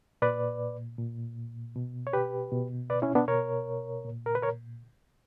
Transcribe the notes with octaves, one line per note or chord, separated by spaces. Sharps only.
A#2 B4 D5
A#2
B2
C#5
G4 B4
B2
B4 D5
C#4 E4
B3 D4
B2 A#4 C#5
A#2
A#4
B4
A#4 C#5